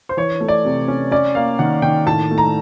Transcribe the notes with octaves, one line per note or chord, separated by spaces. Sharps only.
C5
E3 C#5
A3
D5
C3
C#4
C#4 D5
A#3 F5
D#3 F#5
D#3 G5
A2 A5
A3
A#5